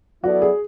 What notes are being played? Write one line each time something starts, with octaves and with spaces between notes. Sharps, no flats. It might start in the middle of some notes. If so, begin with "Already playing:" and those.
F#3 B3 E4 F#4 A4 D5
G#4